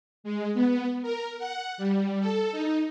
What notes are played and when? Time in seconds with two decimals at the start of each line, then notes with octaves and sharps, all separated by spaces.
0.24 G#3
0.54 B3
1.02 A#4
1.39 F#5
1.78 G3
2.20 A4
2.52 D#4